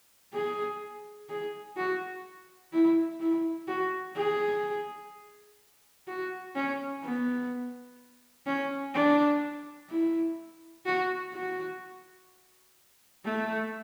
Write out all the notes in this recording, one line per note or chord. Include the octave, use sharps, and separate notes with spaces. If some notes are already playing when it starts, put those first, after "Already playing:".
G#4
G#4
F#4
E4
E4
F#4
G#4
F#4
C#4
B3
C#4
D4
E4
F#4
F#4
A3